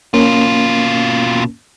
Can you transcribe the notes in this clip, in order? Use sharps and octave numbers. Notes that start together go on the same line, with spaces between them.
B2 A#3 C#4 F4